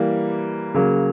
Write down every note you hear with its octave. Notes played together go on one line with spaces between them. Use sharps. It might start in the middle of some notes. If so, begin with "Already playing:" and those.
Already playing: E3 G3 A#3
C#3 F#3 A#3